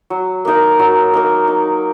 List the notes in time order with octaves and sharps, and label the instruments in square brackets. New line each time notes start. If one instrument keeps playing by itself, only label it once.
[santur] F#3
A#3 D#4 A#4
F#3
A#3 D#4 A#4
D#4